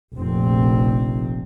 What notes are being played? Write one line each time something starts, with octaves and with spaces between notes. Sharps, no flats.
F1 A#1 A#2 C4